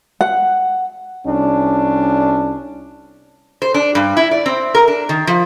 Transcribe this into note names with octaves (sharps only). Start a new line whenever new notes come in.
F#5
C2 C#4 D4
C5
D4
G2
E4
D5
C4
A#4
D4
D#3
F3